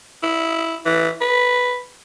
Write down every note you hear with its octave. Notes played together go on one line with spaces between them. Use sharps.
E4
E3
B4